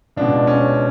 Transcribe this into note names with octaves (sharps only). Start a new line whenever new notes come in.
C#2 B2 D4
C#4